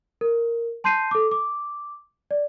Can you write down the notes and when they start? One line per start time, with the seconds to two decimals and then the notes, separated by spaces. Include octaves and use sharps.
0.21 A#4
0.84 A5 C6 G6 C7 D#7
1.11 A4 D6
1.31 D6
2.31 D5